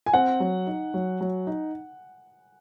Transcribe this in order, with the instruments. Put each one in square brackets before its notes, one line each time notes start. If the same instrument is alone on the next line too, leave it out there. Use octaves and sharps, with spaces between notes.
[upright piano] G#5
[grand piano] C4 [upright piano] F#5
[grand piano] F#3
D#4
F#3
F#3
D#4